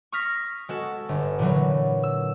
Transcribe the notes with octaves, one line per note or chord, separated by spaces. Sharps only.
C#6 D#6 F6 A#6 B6
G#3 F#4 A4
G1
A#2 D3 E3 F#3
E6